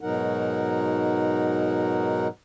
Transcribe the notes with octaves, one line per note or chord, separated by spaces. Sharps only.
G#2 B2 F#3 D#4 A#4 F#5